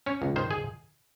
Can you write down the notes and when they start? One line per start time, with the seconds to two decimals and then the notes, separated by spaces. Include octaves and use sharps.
0.06 C#4 C#5
0.22 C#2
0.36 D#3 C5
0.51 G#4